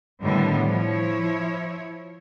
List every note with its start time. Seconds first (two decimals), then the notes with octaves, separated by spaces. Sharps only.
0.21 A2 D3 D#3 G3 B3
0.67 F3 E4 C#5